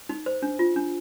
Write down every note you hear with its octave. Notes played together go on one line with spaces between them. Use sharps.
D#4
C5
D4
F4
D4